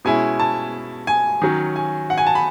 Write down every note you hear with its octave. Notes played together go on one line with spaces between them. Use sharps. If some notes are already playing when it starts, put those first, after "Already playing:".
B2 G#3 C#4 E4 G#5
A5
G#5
D#3 F#3 C#4
G#5
F#5
G#5
A5
B5